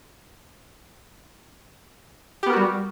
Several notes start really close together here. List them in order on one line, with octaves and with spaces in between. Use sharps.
G4 B3 A#4 F#4 G3